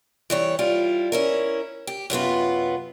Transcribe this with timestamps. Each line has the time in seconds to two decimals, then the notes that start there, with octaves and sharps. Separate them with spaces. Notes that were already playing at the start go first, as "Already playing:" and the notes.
0.30 E3 G3 C#5
0.59 G3 E4 F4
1.12 C#4 E4 A#4
1.87 G4
2.10 F#2 C3 B3 F4